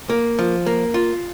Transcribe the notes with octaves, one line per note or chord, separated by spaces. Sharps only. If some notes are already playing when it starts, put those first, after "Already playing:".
A#3
F3
A#3
F4